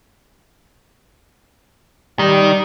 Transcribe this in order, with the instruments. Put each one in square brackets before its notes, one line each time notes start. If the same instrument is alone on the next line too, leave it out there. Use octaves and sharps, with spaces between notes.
[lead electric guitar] D#3 [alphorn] G3